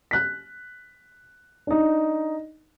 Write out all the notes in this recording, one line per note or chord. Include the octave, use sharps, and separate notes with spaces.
F#6 B6
D4 D#4